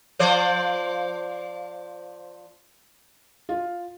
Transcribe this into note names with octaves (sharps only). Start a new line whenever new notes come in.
F3 C5 D5
F4